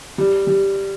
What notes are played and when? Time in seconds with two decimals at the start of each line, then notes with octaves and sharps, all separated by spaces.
0.18 G3
0.47 G3